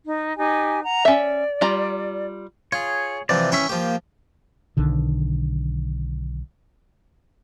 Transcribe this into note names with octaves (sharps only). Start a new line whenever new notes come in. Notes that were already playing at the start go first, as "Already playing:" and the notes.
D#4
D#4 G4 G#5
F#5 A#5
C#4 D5 E5
G3 F4 A#5
F4 G#4 C#5
C3 E3 F3 D5
E3 C#4 E5 G5 B5 C#6
F3 A#3 G4
B1 D3 D#3